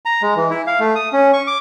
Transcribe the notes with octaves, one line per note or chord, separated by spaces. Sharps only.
A#5
G#3
E3
E4
F5
A3
D#6
C#4
C#6
D6